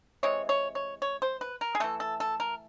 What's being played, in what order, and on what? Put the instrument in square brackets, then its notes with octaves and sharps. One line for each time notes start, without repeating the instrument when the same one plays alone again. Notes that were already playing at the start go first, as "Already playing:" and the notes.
[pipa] C3 E3 G#3 C#5
C#5
C#5
C#5
C5
B4
A#4
G#4
E3 A3 A4
A4
A4
A#4